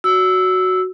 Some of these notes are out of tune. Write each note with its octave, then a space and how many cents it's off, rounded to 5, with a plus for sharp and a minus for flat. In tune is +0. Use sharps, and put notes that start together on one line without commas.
F#4 +0 E6 -5